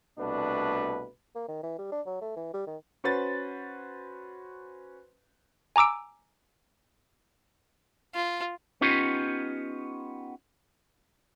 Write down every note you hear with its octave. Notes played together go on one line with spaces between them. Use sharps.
C2 B2 A3 D4 B4
A#3
D#3
E3
G3
D4
F#3
A3
E3
G3
D#3
C#4 F#4 B4 C5 A6
G#5 A#5 D6 E6 D7
F4
B3 C#4 D#4 F4 G4